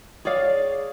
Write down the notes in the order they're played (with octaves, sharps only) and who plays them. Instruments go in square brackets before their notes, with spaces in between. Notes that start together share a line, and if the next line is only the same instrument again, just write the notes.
[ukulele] G#4 C#5 D5 F5